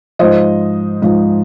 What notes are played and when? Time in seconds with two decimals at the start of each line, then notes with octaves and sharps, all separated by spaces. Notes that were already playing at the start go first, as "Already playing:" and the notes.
0.19 G#2 F3 C5 D#5
1.02 G#2 F3